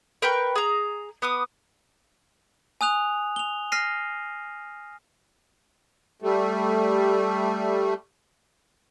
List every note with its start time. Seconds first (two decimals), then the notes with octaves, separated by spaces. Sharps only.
0.22 A#4 B4 G5 C#6
0.55 G#4 A#5
1.22 B3 D6 D#6
2.81 G#5 D#6 F#6 F7
3.36 F7 G7
3.72 F6 A#6 C7 D#7
6.22 G3 A3